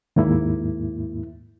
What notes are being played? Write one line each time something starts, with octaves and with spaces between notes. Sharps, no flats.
D#2 G#2 A#3 E4